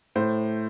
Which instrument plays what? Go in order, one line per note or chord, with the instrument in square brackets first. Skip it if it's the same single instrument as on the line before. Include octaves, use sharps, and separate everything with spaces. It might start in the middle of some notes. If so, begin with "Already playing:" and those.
[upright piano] A2 C5